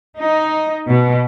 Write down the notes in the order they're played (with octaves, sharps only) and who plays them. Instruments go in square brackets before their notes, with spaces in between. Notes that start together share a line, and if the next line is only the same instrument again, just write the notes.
[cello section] D#4
B2